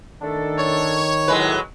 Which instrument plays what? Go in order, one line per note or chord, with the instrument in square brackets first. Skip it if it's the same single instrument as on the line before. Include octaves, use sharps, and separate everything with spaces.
[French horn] D#3 [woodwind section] A3 D4 A4
[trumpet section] C#5
[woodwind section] A2 [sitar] F#3 G#3 B4